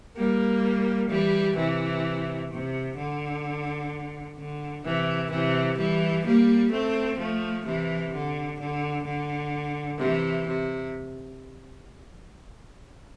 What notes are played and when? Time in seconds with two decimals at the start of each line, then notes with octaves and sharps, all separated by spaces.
0.16 G3 A#3
1.10 E3 G3
1.56 C3 E3
2.51 C3
2.97 D3
4.37 D3
4.84 C3 E3
5.31 C3 E3
5.78 E3 G3
6.25 G3 A#3
6.72 A3 C4
7.19 F3 A3
7.65 C3 E3
8.13 D3
8.59 D3
9.05 D3
9.99 C3 E3
10.47 C3